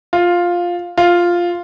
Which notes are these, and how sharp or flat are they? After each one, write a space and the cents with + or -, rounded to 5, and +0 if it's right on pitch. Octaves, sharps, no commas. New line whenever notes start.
F4 +5
F4 +0